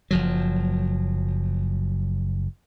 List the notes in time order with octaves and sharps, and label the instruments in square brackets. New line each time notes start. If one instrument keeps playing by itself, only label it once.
[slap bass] F#1 F3 F#3